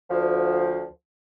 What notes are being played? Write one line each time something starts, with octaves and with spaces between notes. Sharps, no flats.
D2 F3